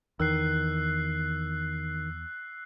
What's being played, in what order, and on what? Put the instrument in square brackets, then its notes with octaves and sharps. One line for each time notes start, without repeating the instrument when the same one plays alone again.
[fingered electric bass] E2 [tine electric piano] D#3 [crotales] E6 F#6 C7